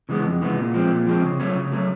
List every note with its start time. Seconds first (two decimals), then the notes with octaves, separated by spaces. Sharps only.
0.09 C#3 E3 G#3 B3
0.25 F2
0.41 C#3 E3 G#3 B3
0.57 A#2
0.74 F3 G#3 C4
0.90 A#2
1.07 F3 G#3 C4
1.23 C#3
1.40 F#3 A3 C#4
1.56 C#3
1.71 F#3 A3 C#4